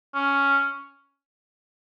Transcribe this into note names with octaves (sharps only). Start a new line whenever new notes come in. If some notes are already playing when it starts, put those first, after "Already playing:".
C#4